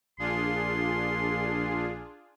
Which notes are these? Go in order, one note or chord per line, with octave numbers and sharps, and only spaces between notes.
A#1 D4 F4 G#4 C6